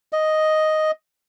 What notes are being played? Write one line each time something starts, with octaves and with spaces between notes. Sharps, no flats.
D#5